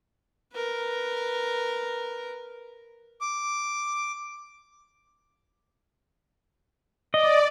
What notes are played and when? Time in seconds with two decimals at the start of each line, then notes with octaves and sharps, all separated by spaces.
0.53 A#4 B4
3.21 D6
7.14 D5 D#5